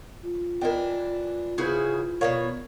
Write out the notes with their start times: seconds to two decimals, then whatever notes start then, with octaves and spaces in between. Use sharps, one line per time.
0.23 F4
0.61 E3 D4 A#4 D#5 G5
1.58 C#3 E4 F#4 G#4 B4 C5
2.21 B2 G3 A#4 C#5 D5 F5